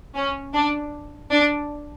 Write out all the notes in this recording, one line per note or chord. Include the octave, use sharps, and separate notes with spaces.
C#4
D4
D4